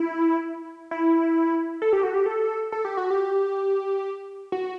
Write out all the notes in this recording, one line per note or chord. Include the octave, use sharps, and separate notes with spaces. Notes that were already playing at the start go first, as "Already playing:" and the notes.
Already playing: E4
E4
A4
G4
F#4
G4
A4
A4
G4
F#4
G4
F#4